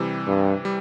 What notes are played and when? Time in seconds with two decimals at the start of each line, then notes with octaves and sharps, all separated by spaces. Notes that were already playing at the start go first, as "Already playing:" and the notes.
Already playing: C3 E3 G3
0.27 G2
0.65 G3